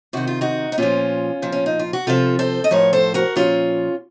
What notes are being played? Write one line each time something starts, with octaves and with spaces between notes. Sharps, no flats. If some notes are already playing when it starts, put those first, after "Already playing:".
C3 D#3 F#4
F4
D#4 F#4
D#4
A#2 F3 C#4 F4
A#2 F3
C#4
D#4
F4
F#4
C3 F3 F4 A4
A4 C5
D#5
A2 F3 A#4 C#5
A4 C5
F#4 A#4
A#2 F3 C#4 F4